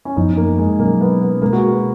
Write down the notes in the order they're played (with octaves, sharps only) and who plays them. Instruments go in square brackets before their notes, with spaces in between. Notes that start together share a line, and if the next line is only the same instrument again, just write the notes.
[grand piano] C#4
[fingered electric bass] F#2 F3 B3 [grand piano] D#4
[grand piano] A#3
G#3
[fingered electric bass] B2 F#3 C#4 [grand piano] A#3
[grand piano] B3
B3
[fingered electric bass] B2 G#3 C#4 [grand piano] A#3
[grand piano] F#4
G#4
B4